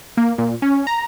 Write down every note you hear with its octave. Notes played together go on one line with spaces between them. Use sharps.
A#3
A#2
C#4
A#5